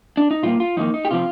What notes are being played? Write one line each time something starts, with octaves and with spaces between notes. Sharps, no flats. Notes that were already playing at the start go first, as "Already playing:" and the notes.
D4
D#4
A#2 G3 A#3 F4
F4
F2 D#3 A#3 D#4
D#4
G4
C3 F3 C4 F4